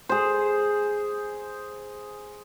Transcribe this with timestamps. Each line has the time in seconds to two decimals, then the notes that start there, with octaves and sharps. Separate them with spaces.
0.09 G#4 C5